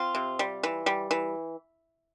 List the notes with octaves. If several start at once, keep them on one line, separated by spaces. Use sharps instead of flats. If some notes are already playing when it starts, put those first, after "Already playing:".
Already playing: C4 F4
C3
G3
E3
G3
E3